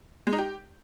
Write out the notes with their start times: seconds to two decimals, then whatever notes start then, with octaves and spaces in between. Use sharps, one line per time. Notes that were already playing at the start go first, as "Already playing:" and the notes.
0.27 G#3
0.33 D#4
0.38 G4